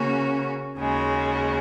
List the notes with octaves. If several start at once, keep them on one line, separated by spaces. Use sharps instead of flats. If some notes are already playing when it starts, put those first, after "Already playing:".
Already playing: C#3 A#3 C#4 F#4
D#2 C#3 G#3 F#4